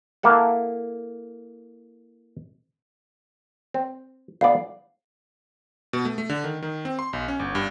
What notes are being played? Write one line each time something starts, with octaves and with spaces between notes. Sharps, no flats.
A#3 E4 A4 F#5
C4
D2 B3 D5 F5
B2
A3
A3
D3
D#3
D#3
C4
C6
B1
C#4
G1
G2